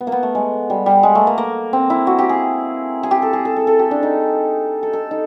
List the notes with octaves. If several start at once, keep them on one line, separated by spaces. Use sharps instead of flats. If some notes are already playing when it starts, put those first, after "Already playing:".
B3
A#3
B3
A3
G#3
G3
G3
G#3
A3
A#3
A#3
C4
E4
F#4
G4
G#4
G#4
G4
A4
G#4
A4
A4
A4
G4
D4
D#4
A4
A4
D#4